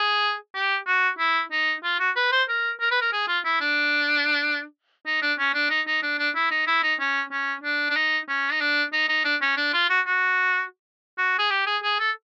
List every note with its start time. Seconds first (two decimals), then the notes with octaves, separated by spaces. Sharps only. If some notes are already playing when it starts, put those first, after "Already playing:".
Already playing: G#4
0.55 G4
0.87 F#4
1.19 E4
1.52 D#4
1.84 F4
1.99 F#4
2.16 B4
2.32 C5
2.49 A#4
2.80 A#4
2.91 B4
3.01 A#4
3.13 G#4
3.28 F4
3.45 E4
3.61 D4
5.06 D#4
5.22 D4
5.39 C#4
5.54 D4
5.70 D#4
5.87 D#4
6.03 D4
6.19 D4
6.35 E4
6.51 D#4
6.67 E4
6.83 D#4
6.99 C#4
7.32 C#4
7.63 D4
7.90 D4
7.96 D#4
8.28 C#4
8.52 D#4
8.61 D4
8.93 D#4
9.09 D#4
9.24 D4
9.42 C#4
9.57 D4
9.73 F4
9.89 F#4
10.06 F#4
11.18 F#4
11.38 G#4
11.51 G4
11.66 G#4
11.83 G#4
11.99 A4